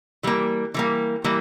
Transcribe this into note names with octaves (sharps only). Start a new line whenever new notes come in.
E3 G3 A#3
E3 G3 A#3
E3 G3 A#3